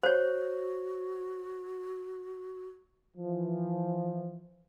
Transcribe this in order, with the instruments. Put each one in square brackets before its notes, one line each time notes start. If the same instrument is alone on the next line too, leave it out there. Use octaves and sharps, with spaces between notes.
[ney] F#4 [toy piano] C5 C#5
[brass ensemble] E3 F3